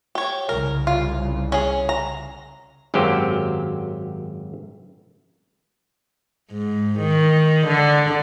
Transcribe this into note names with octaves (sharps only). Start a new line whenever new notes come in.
G4 C#5
C2 C#3 A#4
F4
C#4 G#4
A#5
G#1 F#2 F#3 A#3 G4 C5
G#2
D#3
D3